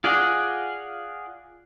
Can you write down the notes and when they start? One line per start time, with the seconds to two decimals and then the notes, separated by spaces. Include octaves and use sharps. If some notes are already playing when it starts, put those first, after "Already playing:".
0.04 F4 G#4 D5 D#5 F#5